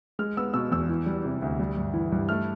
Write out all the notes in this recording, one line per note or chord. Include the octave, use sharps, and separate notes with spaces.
G#3 F6
B3 E6
B2 E6
E2 E6
E3
G3
C3
D2
G3
G2
E3
G2
A3 F6